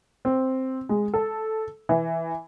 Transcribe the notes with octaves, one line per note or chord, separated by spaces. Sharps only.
C4
G#3
A4
E3